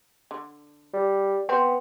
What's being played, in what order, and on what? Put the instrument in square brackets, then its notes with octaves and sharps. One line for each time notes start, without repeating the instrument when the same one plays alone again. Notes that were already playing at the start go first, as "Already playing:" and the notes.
[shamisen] D3
[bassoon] G3
[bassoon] B3 [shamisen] C4